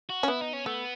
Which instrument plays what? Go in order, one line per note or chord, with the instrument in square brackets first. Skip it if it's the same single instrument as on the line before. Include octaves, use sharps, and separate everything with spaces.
[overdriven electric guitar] F#4
[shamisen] C#4
[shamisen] B3 [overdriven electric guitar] E4
[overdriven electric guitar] D#4
C#4
[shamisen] A3 [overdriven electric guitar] B3